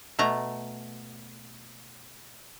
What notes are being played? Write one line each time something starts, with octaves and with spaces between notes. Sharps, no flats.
B2 A3 A#5